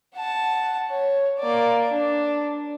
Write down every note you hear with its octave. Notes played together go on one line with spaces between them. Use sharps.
F#5 A5
C#5
A#3 D5
D4